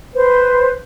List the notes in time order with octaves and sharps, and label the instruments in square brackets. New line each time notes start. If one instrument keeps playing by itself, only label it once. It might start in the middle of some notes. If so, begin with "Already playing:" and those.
[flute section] B4 C5